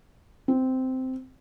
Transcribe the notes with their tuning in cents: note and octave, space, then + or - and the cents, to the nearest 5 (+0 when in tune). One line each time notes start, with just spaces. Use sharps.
C4 -10